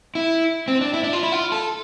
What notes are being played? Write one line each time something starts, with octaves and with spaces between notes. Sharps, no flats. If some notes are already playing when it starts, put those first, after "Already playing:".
E4
C4
D4
E4
D4
F4
E4
F4
A4